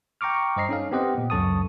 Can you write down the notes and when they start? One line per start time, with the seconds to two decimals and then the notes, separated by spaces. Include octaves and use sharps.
0.21 G5 A#5 C#6 D6 F6
0.56 G2 C5 D#5 A#5 C7
0.69 C#4 D#4 A4 F5
0.91 B3 C4 G4 C5 D#5 F#5
1.18 A#2
1.30 C#2 F#2 A4 A5 C#6 D#6